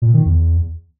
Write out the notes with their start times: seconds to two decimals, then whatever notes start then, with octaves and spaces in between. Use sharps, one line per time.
0.02 A#2
0.14 D#3
0.26 E2